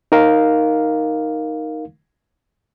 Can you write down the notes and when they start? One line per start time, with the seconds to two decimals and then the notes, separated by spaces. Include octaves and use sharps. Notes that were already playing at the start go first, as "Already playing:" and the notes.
0.12 D#4 A#4 F5